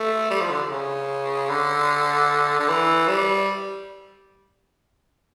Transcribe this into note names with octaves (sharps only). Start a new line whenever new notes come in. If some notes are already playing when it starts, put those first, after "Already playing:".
Already playing: A3
G3
F3
D3
C#3
D3
D3
E3
G3